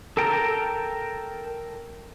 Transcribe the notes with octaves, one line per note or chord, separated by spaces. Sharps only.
A4 A#4 G5 A5 A#5